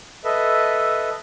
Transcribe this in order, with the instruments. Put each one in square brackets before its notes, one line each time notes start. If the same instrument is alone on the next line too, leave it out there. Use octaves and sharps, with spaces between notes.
[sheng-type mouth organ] A4 B4 D#5 E5